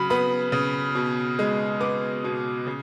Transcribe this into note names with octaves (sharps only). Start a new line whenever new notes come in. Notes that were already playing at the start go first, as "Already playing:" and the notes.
Already playing: C#3 F#3 B5
B3 B5
C#3
B2
G#3
B3 D6
B2
C#3